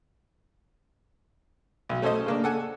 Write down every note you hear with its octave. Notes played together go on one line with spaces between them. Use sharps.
B1
A3 C#4 A4 C5 D#5
C#3 A#3 D4
A4 F#5 G#5